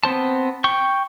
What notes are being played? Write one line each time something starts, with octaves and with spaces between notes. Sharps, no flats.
B3 C4 C5 A5
G5 C#6